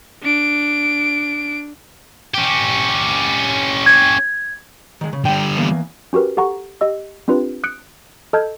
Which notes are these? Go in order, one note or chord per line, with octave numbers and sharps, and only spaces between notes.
D4 D7
C#4 G4
G#6
D#3 G#3
C#3
D3 G3 G5
E3 A#3 B3
C#4 F#4 G4 A#4 B4
G4 A4 F#5 A#5 C#6
G4 D#5 E6
C4 D4 F4 G4 B4
D#6 F#6 C#7 D7
A4 D#5 A5 F6 G6 G#6